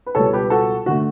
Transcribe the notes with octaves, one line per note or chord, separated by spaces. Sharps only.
B4
C#2 B2 G3 A4 C#5
G4 B4
F#4 A4
D3 A3 F#4